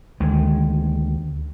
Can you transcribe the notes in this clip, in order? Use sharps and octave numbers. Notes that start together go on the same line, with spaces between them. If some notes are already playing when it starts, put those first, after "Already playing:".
D2 D#3 G#3